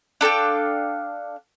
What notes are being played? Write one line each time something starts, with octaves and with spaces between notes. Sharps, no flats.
D4 A4 F5 G5